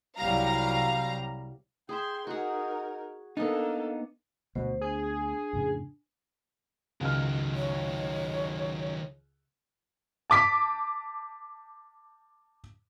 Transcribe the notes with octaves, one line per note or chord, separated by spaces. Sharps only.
C2 F#3 G3 F5 A#5
G#4 E5 G5 C6
D#4 F#4 G#4 A#4
A#3 B3 D4 D#4 A4 D#5
D2 B2 G#3 B3 C5
D4 G#4 G#5
F2 A2 C#3
C#2 D#3 F#3 F6
C#5
A5 D6 B6